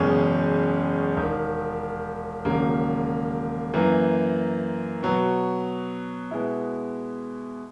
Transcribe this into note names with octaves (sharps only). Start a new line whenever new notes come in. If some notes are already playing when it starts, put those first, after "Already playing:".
Already playing: F#1 E2 B2 G#3 C#4
E1 D#2 D#3
E1 D#2 C#3 F#3 A#3
F#2 E3 A#3
B2 F#3 B3
B2 G#3 B3 E4